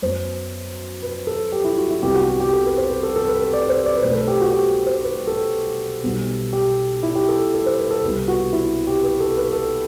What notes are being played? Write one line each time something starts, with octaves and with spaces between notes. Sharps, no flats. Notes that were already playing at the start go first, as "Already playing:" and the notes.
F#2 F#3 B3 C5
B4
A4
G4
E4
F#4
E4
C2 C3 G3 B3 G4
F#4
G4
G4
A4
B4
C5
B4
A4
A4
B4
B4
D5
C5
D5
B4
B1 B2 A3 C5
B4
A4
G4
F#4
G4
C5
B4
A4
B1 B2 G3 B3
G4
E4
G4
A4
A4
C5
B4
A4
C2 C3 G3 B3
F#4
E4
G4
B4
A4
B4
A4